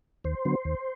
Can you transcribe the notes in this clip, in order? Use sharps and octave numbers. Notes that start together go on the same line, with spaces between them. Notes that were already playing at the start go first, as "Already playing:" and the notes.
D#2 C5
D3 F#3 B3
D#2